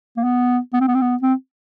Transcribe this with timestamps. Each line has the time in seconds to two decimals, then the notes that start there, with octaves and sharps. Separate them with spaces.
0.17 A#3
0.24 B3
0.74 B3
0.81 C4
0.88 B3
0.95 C4
1.02 B3
1.22 C4